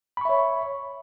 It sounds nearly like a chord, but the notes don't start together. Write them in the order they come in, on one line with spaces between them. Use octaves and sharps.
B5 C#6 E5 C#5